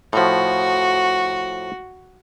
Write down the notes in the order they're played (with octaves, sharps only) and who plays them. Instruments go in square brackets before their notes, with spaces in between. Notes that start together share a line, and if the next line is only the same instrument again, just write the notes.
[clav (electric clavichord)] A2 F3 [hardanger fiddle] F#4